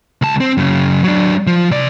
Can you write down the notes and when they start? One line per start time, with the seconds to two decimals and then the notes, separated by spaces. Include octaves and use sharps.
0.22 C#2 A5
0.40 C4
0.57 F#2 C#3
1.04 F#3 D4
1.47 F3
1.71 C3 D5